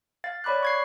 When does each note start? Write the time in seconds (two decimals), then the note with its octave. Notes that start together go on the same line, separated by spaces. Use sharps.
0.24 F5 A6
0.44 C#5 D5 B5 D6 F#6
0.63 C#6 G#6 C7